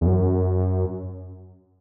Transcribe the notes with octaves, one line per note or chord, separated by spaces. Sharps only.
E2
F#2